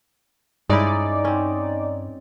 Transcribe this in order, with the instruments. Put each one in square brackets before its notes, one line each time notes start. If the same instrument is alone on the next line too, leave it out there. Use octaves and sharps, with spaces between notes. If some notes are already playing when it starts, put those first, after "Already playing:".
[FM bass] G2 [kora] G#3 C#4 E4 [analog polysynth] D#4 D5
[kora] C4 C#4